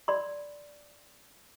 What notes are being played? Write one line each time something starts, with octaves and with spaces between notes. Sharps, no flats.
D5 B5 C6